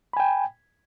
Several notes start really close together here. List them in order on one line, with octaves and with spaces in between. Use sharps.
B5 G#5 G5